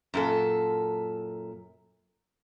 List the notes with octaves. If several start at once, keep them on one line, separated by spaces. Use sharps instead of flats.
F#2 A#2 A4